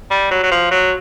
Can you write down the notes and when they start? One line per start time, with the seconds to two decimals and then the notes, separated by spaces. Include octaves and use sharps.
0.11 G3
0.31 F#3
0.43 F#3
0.51 F3
0.71 F#3